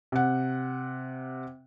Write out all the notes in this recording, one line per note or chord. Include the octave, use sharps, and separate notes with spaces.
C3 F#5